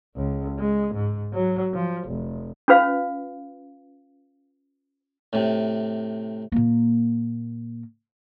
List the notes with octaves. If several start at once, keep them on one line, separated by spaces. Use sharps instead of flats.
C#2
G#3
G#2
F#3
F3
F1
C#4 F4 B4 F5
A2 C3
A#2 A#3